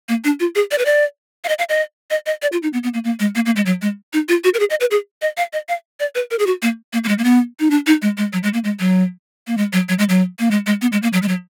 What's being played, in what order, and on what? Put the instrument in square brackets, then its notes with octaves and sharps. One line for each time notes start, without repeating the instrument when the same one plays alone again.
[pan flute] A#3
D4
F4
G#4
D5
B4
D5
F5
D#5
F5
D#5
D#5
D#5
D5
F4
D#4
B3
B3
A#3
A#3
G#3
A#3
A#3
G#3
F#3
G#3
D#4
F4
F#4
A#4
G#4
D#5
B4
G#4
D#5
F5
D#5
F5
D5
B4
A#4
G#4
F#4
A#3
A#3
A#3
G#3
A#3
B3
D#4
D4
D#4
G#3
G#3
F#3
G#3
A#3
G#3
F#3
A#3
G#3
F#3
F#3
G#3
F#3
A#3
G#3
G#3
B3
G#3
A#3
F#3
G#3
F#3